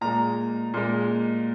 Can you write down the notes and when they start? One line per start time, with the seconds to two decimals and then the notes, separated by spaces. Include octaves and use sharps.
0.01 A#2 G#3 A#5
0.74 A#2 G#3